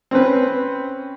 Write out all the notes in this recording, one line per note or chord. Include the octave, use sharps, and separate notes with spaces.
C4 C#4 B4